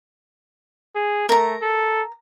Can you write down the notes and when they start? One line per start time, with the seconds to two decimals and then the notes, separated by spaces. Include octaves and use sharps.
0.96 G#4
1.29 A3 A#4 A#5
1.62 A4